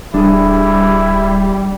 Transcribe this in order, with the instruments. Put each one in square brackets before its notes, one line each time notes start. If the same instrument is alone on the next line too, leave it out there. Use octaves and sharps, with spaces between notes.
[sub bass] D1 [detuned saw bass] G3 [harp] D4 G#4 [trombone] E4